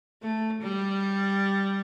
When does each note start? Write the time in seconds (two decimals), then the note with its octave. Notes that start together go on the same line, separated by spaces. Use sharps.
0.22 A3
0.62 G3